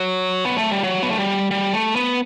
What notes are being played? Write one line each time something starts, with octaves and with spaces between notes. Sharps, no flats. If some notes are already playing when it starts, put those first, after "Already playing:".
Already playing: F#3
B3
A3
G3
F#3
B3
A3
G3
G3
A3
B3